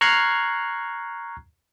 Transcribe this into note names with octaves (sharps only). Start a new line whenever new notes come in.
A#5 C#6 F6 F#6 G#6 C7